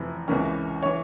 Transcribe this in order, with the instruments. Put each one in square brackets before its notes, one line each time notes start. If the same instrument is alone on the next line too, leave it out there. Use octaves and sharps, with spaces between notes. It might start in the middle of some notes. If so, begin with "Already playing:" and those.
Already playing: [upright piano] F1 F2 E3
C#2 C3 E3 A#3 C#4
E3 C#5